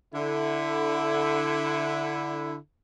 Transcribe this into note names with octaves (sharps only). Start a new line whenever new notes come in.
D3 E4